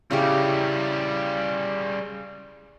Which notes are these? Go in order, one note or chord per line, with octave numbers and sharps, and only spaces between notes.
C#3 G3 C#4 E4 G4